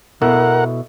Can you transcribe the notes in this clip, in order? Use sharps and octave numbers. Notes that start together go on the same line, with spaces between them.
B2 E4 A4 A#4 F#5